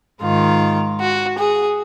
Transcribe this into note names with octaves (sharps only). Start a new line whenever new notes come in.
G#2 D#3 F4
F#4
G#4